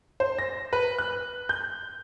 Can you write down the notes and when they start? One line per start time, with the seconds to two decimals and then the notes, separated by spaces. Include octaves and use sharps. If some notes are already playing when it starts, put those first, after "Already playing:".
0.20 C5
0.39 A#6
0.73 B4
0.99 F#6
1.49 G6